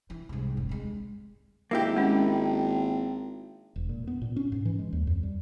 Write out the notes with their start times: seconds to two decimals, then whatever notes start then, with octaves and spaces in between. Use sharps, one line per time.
0.10 E3
0.29 C2 G#2
0.57 F1
0.69 D2 G#3
1.71 G#1 A#3 E4 G4
1.97 G#3 C#4
3.76 E1
3.89 A#2
4.07 B3
4.21 A#2
4.36 C#4
4.52 G#2
4.65 E3
4.79 G#3
4.93 D#2
5.07 F2
5.23 G3